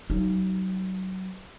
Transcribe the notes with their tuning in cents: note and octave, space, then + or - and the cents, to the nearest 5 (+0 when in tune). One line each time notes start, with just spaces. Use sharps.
F#3 +25 D#4 +0